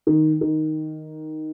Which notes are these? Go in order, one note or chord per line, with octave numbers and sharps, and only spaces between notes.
D#3
D#3